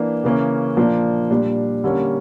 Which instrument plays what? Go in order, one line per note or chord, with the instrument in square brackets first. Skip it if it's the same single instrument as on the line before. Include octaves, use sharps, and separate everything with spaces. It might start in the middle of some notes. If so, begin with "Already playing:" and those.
Already playing: [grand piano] E3 A#3 D4
C#3 E3 A#3 C#4
A#2 F3 A#3 D4
A#2 G3 D4
D3 G3 A#3 C#4